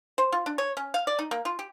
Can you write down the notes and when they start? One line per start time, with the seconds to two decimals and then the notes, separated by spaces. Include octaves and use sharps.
0.18 C5
0.32 F4
0.46 D4
0.58 C#5
0.77 C#4
0.94 F5
1.07 D5
1.19 D#4
1.31 A#3
1.45 F4
1.59 G4